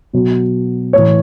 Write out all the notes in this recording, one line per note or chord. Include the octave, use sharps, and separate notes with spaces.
B2 F#3
A2 E3 C#5